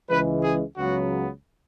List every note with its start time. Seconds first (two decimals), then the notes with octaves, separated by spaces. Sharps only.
0.09 C#2 C#3 E3 G#3 B4
0.43 G#4
0.75 C#2 C#3 F#3 B3 F#4